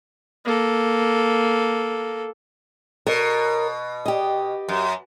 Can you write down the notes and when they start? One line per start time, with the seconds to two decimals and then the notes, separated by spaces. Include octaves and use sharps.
0.45 A#3 A4
3.07 B2 A#4 C#5
4.06 G4 D#5
4.69 F#2